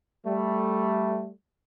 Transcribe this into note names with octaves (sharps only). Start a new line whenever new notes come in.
G3 A3